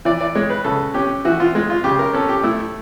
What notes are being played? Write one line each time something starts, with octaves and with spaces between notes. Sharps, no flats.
E3 D5
D5
G#3 C#5
B4
C#3 A4
C#4 G4
E3 F#4
F4
G#3
F4
C#3 G4
A#4
C#4 A4
G4
A3 E4